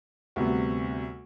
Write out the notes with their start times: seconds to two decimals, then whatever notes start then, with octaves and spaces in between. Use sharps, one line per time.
0.36 D2 C3 G3 B3 F#4